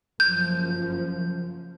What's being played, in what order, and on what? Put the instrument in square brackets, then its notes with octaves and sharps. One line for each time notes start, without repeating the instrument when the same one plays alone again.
[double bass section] F#1 F#2 F3 [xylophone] G6